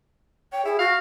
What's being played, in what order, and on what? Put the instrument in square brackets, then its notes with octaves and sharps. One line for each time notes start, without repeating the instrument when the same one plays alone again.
[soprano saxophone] C#5 [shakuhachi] G5
[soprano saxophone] E4 [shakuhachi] G#4
[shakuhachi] F#4 [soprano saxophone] F5